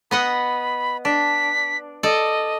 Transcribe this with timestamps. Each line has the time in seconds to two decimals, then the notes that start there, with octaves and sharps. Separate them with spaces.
0.11 B3 D#5 F#5 B5
1.05 D4 B6
2.03 A4 D5 D#5